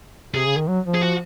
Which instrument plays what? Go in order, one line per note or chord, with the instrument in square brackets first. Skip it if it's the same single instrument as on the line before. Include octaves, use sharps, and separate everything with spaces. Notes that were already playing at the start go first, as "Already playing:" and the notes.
[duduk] C3 [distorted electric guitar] G#4
[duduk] C#3
D#3
F#3
F3
[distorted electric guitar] G#4
F#4